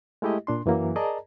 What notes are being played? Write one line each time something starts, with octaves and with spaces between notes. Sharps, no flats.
G#3 A3 E4 G4 D#5
A#2 D4 C6
F#2 E3 F#3 A#3
G#4 A#4 D5 D#5 A5 A#5